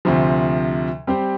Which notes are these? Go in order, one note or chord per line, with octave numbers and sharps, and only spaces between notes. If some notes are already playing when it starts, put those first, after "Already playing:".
D2 C3 F3
G3 C4 G4 C5